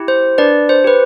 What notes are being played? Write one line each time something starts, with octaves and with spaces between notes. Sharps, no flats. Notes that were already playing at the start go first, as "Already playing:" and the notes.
Already playing: E4 G4
C5
D4 B4 D5
C5
G4 B4